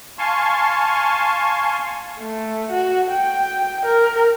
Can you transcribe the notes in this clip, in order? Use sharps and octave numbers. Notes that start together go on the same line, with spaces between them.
F5 G#5 A5 C6 C#6
A3
F#4
G5
A#4